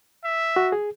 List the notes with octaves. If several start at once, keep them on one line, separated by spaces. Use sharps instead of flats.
E5
F#4
G#4